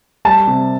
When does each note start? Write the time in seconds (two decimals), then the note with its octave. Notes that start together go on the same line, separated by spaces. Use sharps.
0.25 G3 A5
0.47 C3